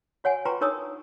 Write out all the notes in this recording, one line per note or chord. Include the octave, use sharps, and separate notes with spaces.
F#4 C#5 F#5 G#5
F4 B4 G5 A#5 C6 C#6
D4 D#4 A#4 C#5 A#5 D#6